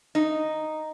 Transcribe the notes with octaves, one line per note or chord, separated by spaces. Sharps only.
D#4